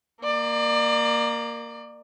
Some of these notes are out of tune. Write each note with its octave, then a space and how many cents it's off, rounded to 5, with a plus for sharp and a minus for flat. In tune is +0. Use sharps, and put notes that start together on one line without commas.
A#3 +0 D5 +30